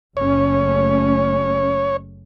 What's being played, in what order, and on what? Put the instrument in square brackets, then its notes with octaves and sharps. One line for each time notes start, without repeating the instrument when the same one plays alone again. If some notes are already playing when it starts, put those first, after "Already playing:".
[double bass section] F#1 A3 C#4 [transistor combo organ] C#5